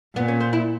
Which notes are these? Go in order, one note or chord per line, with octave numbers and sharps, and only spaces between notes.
A#2 B3
C#4
C4
E4